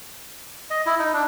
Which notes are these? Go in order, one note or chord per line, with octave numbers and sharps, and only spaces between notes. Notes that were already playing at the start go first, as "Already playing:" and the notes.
D#5
E4
D#4
D4